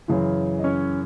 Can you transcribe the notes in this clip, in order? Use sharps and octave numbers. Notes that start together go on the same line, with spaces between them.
F#2 C#3 E3
D#5
C#4 C#5